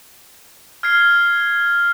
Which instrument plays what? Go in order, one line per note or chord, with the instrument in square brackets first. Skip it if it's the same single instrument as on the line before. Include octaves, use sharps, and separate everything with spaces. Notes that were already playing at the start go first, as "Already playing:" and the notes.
[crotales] F6 G#6 C7